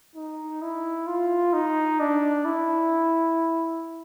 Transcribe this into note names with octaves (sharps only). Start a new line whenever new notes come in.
D#4
E4
F4
D#4
D4
E4